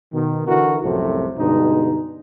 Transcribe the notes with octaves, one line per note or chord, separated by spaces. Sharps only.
B2 D#3
D3 E3 E4 F#4 A#4
C2 F#2 A2 C3 F3 A3
G2 B2 D3 G#3 D#4